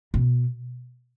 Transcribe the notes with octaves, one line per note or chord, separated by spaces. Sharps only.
B2